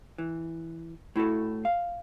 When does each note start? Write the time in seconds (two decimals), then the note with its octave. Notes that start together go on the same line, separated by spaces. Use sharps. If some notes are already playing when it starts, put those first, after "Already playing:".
0.18 E3
1.16 A2 E4 F#4 A4
1.65 F5